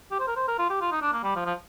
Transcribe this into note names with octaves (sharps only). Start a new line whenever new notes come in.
G4
C5
A#4
C5
A#4
F4
G4
F4
D#4
D4
A#3
G3
F3
F3